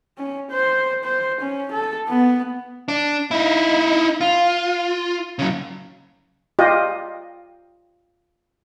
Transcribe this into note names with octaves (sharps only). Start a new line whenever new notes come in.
C#4
C5
C5
C#4
A4
B3
D4
D#4 E4
F4
C#3 F#3
F4 G4 D#5